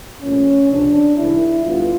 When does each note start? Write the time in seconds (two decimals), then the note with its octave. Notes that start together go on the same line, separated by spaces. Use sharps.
0.22 C2 A#2 F3 A3 C#4
0.70 C#2 C3 F3 D4
1.16 C2 C3 D#3 G#3 E4
1.63 D2 D3 G3 B3 F4